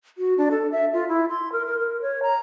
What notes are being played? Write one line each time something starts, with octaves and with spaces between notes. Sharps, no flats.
F#4
D4
A4
E5
F4
E4
C6
A#4
A#4
A#4
C#5
A#5